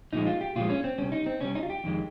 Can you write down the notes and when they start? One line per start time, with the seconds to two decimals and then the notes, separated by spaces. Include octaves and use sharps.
0.13 A#2 F3 G#3 D#4
0.26 F4
0.41 G4
0.56 A#2 F3 G#3 F4
0.70 C#4
0.84 C4
0.98 C3 G3 C#4
1.12 D#4
1.26 C4
1.40 C3 G3 C#4
1.55 D#4
1.63 F4
1.70 G4
1.84 F2 D#3 G#3